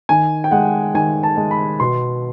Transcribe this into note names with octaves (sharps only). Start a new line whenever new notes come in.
D#3 G#5
G5
G#3 F#5
D#3 G#5
A5
G#3
B5
B2 C6